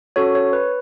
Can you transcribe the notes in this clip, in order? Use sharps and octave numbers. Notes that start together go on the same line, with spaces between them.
C#4 F#4 A4 C#5
C#5
B4